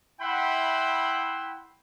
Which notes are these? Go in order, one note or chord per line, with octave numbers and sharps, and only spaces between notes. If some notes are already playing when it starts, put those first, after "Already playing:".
E4 E5 F#5 G5 B5 C6